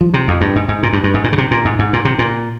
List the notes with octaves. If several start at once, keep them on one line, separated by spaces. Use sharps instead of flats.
F3
C3
F2
G2
G#2
G#2
A#2
G2
G2
G#2
A#2
C#3
C3
A#2
G#2
G#2
A#2
C3
A#2